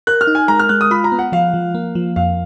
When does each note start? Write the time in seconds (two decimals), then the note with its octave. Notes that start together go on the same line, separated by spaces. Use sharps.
0.07 A#4 F#6
0.21 F6
0.27 D#4
0.35 G#5
0.48 G#3 A#5
0.59 F6
0.69 G#3 F#6
0.81 D#6
0.91 F4 B5
1.04 A#5
1.12 B3
1.19 F#5
1.32 F3 F5
1.54 F3
1.75 A#3
1.95 F3
2.16 F2 F5